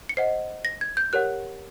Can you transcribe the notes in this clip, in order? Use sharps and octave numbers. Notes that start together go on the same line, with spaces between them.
C#7
C5 D#5 F#5 C7
A#6
G#6
G6
G4 A#4 C#5 F#5 F#6